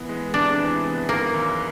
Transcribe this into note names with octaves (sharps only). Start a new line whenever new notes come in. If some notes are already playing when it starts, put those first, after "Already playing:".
Already playing: E3 B3
G#3
C3 D4
E3
B3
D#3 A#3
F#2